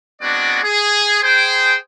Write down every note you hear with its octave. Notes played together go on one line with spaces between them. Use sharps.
G#3 B3 C4 D4 F#4 D5
G#4
G#4 C5 G5